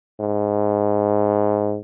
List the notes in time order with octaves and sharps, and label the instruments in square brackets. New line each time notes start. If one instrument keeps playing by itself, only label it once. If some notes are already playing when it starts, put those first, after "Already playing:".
[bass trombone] G#2